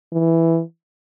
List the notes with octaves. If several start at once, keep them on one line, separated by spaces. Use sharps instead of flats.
E3